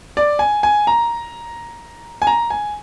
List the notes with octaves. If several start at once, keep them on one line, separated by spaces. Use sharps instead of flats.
D5
G#5
G#5
A#5
G#5
A#5
G#5